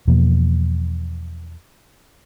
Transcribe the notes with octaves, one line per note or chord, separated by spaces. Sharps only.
E2 B2 F3 A#3